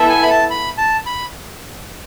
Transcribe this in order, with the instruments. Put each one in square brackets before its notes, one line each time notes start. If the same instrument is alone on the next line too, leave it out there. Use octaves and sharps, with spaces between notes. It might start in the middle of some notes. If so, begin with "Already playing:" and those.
Already playing: [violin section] B3 E4 A4 E5
[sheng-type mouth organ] G#5
B5
A5
B5
A5
B5